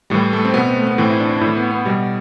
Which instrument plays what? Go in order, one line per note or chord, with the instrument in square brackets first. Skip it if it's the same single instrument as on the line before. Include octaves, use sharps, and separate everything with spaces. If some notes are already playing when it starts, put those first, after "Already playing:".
[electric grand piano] A2 E3 G3
A3
C4
B2 B3
C4
A3
B3
A2 E3 C4
E4
D4
D4
A2 E4
E3
B3
B3
B2 G3